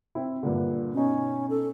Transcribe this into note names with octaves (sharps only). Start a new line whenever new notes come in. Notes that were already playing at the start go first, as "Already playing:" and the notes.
C4 E4
G2 A#2 D3
B2 C#4 D#4
A4